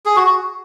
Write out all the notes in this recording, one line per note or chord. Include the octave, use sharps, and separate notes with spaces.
G#4
F#4